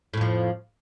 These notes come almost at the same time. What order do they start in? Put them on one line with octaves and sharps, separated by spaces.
A2 F2 F3